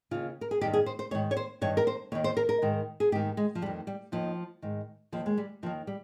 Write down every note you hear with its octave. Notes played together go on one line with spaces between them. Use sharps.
D#2 C#3 F4
A#4
G#4
G2 D#3 G4
G#4
C5
C5
G#2 D#3 C#5
C#5
C5
G2 D#3 C#5
A#4
C5
D#2 D#3 C#5
C5
A#4
A#4
G#2 D#3
G#4
G#2 D#3 G4
G#3
F3
F2 D#3 G3
G3
D#2 D#3 F3
G#2 D#3
D#2 D#3 F3
G#3
G3
D#2 D#3 F3
G3